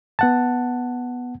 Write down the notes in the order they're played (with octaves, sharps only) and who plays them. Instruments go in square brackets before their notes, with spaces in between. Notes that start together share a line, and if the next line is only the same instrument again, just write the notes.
[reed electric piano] B3 F#5 A5